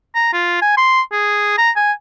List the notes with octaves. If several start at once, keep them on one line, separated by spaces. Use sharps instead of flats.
A#5
F4
G#5
C6
G#4
A#5
G#5